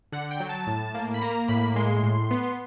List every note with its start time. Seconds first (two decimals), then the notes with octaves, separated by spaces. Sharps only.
0.12 D3 F#5
0.31 G5
0.40 F#3
0.49 A5
0.67 A2
0.95 A#3
1.14 B5
1.21 A#3 A#5
1.48 A2 B5
1.76 G#3 C6
2.03 A2
2.31 B3